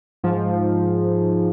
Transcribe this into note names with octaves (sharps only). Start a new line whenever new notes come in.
G#2 F3